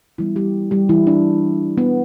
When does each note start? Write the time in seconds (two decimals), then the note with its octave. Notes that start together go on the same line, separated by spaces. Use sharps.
0.18 E3 G3 B3 E4
0.36 G3 G4
0.71 G3 G4
0.89 E3 E4
1.07 D4
1.78 B3